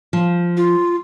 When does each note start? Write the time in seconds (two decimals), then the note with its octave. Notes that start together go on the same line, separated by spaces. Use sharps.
0.13 F3
0.57 F4